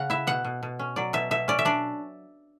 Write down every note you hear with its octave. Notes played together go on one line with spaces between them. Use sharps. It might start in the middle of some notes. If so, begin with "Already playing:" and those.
Already playing: C#3 F#5
E4 E5
B2 F#5
B2
B2
C#4
F#3 D5
B2 E5
B2 E5
C#4 D5
E5
D4 D5